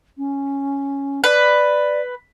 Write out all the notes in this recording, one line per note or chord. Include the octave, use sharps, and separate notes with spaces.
C#4
B4 D5